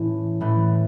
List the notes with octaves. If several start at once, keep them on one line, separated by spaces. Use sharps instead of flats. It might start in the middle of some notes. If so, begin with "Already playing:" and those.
Already playing: A2 E3 A3 C#4
A2 E3 A3 C#4